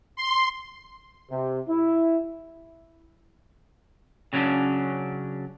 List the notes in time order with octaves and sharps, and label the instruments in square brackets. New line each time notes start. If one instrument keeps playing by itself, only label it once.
[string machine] C6
[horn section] C3
E4
[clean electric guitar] C#3 F#3 C#4 D4